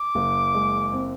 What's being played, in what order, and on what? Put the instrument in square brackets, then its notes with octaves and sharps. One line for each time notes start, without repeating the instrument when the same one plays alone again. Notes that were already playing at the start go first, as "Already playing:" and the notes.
Already playing: [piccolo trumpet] D6
[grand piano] F#1
G#3
C4